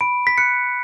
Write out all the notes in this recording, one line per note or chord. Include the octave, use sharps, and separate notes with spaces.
B5 D7
B6
F#6 C#7